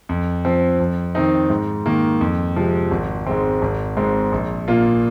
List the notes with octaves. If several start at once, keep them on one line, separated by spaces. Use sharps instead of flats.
F2
F3 C4
F2
D#3 C4 D#4
G#2
D#3 A#3
F2
C3 F3 G#3
G#1
G#2 G#3 C4
G#1
G#2 G#3 C4
A#1
A#2 A#3 F4